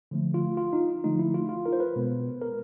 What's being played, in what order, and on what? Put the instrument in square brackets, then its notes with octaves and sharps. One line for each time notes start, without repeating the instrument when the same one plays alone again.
[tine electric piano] D3 F3 A3
F4
F4
D#4
D3 F3 A3 D#4
E4
F4
F4
A#4
C5
B4
B2 G#3 B3
A#4